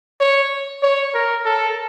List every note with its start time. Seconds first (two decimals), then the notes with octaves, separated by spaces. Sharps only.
0.20 C#5
0.83 C#5
1.14 A#4
1.45 A4